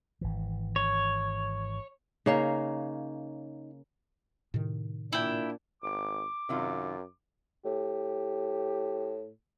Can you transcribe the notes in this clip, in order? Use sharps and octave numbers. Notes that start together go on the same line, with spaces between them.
G#1 E3
C#5
C#3 A#3 D#4 C#5 F5
A2 C3 D#3
A#2 D4 E4 G5
G#1 D6
F#2 C3 D#3 F4
A2 G4